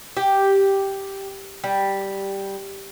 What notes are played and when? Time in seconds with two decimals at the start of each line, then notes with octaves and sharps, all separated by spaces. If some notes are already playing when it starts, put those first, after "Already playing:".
0.17 G4
1.64 G3